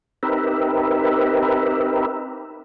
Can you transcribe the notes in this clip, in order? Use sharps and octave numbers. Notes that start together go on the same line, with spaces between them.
C4 D#4 G4 A#4 B4 E5